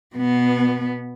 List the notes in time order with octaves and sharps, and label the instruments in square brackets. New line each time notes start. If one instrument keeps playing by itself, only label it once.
[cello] B2 B3